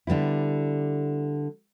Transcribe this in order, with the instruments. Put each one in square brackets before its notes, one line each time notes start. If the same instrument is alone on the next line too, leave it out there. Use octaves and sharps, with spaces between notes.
[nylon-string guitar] D3 G3 B3 E4